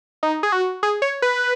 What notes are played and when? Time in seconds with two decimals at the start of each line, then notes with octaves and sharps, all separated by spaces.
0.23 D#4
0.43 G#4
0.52 F#4
0.83 G#4
1.02 C#5
1.22 B4